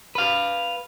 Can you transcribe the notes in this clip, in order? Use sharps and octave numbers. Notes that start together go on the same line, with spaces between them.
B4 F5